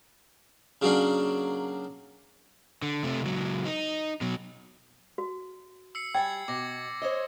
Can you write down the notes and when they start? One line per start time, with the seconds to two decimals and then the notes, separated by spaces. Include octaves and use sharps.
0.82 C#3 F#3 A#3 D4
2.82 D3
3.03 C3 A3
3.22 C#2 F#3
3.66 D#4
4.21 B2 F#3
5.18 F#4
5.95 E6 C7 C#7
6.15 G3 G5 G#5 G#6 A6
6.48 B2 D6 A#6
7.02 C5 C#5 D#5